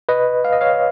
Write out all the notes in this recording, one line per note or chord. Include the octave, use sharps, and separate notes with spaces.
B4 D#5
F5
D#5
C#5 F5